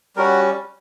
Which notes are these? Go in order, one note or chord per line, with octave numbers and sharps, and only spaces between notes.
G3 C#4 F#4 A#4